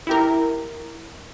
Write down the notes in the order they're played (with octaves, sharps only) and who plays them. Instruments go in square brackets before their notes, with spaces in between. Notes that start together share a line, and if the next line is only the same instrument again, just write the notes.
[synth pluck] E4 G4 A#4